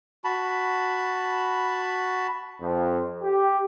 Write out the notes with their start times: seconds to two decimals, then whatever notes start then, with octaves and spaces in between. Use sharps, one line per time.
0.24 F#4 A5 B5
2.61 F2
3.22 G4